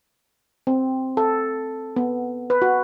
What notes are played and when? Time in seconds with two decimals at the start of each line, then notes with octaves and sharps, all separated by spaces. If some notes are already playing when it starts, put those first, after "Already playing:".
0.67 C4
1.17 A4
1.96 B3
2.50 B4
2.62 F#4